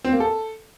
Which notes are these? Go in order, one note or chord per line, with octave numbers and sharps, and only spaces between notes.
C4
A#3
A4